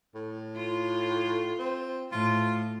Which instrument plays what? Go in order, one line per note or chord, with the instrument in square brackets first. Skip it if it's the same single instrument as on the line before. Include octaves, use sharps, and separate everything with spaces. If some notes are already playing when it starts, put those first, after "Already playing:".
[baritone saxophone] A2
[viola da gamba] F4
[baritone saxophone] C4
[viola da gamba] A2 [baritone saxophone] F4